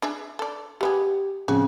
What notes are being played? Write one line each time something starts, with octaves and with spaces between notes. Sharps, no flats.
D4 G#4 E5
A4 D5
G#3 B3 G4 G#4
A2 C#3 F3 C4 F#4